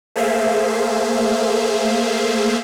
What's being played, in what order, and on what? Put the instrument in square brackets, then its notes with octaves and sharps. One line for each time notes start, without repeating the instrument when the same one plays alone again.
[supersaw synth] A3 A#3 G#4 C5 E5 F5